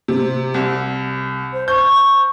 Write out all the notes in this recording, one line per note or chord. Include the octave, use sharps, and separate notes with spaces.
C3
C2
C5
C#6 G6